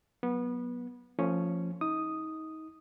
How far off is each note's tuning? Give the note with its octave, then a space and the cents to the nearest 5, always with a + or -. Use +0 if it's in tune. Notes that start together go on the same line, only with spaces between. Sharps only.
F#3 +0 B3 -20
F3 +0 A3 +45 C#4 +0
D#4 +30 D#6 +0